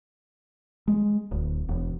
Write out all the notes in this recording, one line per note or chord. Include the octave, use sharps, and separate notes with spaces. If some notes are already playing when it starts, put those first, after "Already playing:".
G#3
D1
E1